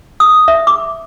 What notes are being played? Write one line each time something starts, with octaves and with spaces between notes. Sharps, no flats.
D#6
E5
D6